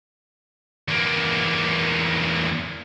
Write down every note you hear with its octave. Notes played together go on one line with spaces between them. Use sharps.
E2 A#3